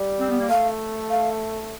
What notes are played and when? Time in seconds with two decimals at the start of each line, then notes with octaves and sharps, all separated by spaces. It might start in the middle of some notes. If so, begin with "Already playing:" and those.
Already playing: G3
0.19 C4
0.30 B3
0.39 A#3
0.49 A3 F5
1.10 F5